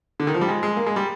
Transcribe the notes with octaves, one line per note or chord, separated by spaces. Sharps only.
D3
D#3
F3
G3
G#3
G#3
A#3
G#3
G3